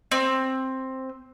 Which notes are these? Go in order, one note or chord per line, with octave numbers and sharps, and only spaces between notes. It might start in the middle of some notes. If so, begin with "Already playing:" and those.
C4